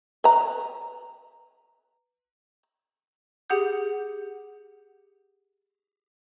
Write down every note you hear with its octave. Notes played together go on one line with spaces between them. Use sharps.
B4 A#5
G4 G#4 F#5 D#6 G6